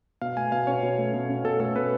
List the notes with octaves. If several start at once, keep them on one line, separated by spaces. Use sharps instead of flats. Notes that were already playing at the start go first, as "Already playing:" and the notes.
B2 F5
A3 G#5
B2 F5
C#4 C#5
B2
A3
B2
C#4
B2 A4
A3 A4
B2 B4